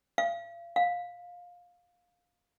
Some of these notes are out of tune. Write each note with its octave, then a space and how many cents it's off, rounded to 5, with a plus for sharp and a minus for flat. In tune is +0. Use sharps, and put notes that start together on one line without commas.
F5 -35
F5 +15